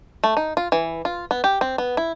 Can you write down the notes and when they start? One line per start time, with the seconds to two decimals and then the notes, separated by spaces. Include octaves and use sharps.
0.24 A3
0.37 D#4
0.57 F4
0.72 E3
1.05 F4
1.31 B3
1.44 G4
1.61 C4
1.78 B3
1.97 E4